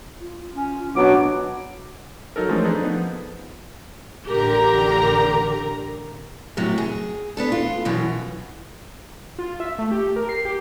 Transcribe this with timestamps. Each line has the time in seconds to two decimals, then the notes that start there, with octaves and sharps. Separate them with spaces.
0.21 F4
0.54 C#4
0.96 B2 F#3 B3 D4 D6
2.36 F#3 D#4 A4 A#4
2.49 E3 F3 G#3 A3 C4 C#4
2.63 D4 D#4 G#4 A4 B4
2.82 F3 B3
4.28 A1 D3 G4 A#4 A#5
6.57 F#2 A2 C3 F#3
6.78 G#4
7.37 B3 D4 A4
7.52 F4
7.85 F#2 B2 E3
9.39 F4
9.60 E5
9.78 A3
9.92 G4
10.16 A#4
10.29 C7
10.45 G4